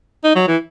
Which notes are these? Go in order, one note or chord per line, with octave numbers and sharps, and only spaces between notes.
D#4
F#3
E3